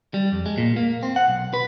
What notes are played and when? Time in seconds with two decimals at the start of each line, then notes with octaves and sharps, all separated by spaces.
0.14 G3
0.32 F2
0.46 G#3
0.58 A#2
0.76 A#3
1.03 C4
1.16 F#5
1.28 B1
1.54 B4